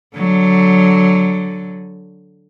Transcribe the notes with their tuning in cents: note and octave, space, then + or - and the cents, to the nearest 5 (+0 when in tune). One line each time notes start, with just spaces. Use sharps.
D3 +0 F#3 +0